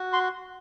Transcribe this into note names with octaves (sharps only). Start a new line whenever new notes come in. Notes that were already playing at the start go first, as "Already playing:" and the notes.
Already playing: F#4
C6